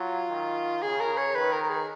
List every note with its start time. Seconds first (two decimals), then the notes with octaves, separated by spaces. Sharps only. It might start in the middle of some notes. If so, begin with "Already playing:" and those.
Already playing: F#3 F4
0.31 D#3
0.82 C#3 G#4
1.00 A#4
1.17 C#5
1.35 D#3 B4
1.52 A#4
1.63 A#4
1.69 G#4